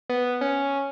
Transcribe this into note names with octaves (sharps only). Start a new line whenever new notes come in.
B3
C#4